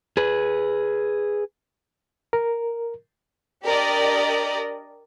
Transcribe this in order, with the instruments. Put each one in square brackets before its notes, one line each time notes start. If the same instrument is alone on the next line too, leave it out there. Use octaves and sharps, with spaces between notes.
[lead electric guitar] G#4 B4
[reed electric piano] A#4
[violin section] D4 G4 A#4 D5 D#5